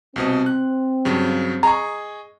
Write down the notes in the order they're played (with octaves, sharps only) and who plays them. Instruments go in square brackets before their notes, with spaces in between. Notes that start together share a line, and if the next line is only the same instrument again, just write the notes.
[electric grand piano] C2 B2 D#5 [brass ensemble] C4
[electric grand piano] F#6
G2 C#3 F#3
[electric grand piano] G#4 D#5 C#6 [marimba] A#5